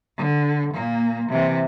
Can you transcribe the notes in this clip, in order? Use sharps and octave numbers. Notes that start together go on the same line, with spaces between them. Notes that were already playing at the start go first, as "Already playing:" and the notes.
D3
A#2 A#3
C3 E3